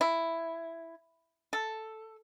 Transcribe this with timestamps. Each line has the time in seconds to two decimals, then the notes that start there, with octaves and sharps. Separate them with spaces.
0.01 E4
1.53 A4